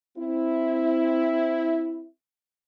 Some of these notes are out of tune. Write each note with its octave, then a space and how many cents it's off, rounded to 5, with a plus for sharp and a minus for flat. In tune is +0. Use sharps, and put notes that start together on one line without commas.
C4 +0 E4 +0